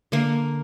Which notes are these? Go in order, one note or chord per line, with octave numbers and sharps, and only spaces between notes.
D3 A#3 A#4